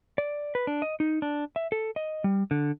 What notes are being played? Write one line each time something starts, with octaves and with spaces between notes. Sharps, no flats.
D5
B4
D4
D#5
D#4
D4
E5
A4
D#5
G3
D3